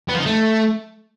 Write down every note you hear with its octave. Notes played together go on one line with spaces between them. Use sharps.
B3
F3
D#4
A3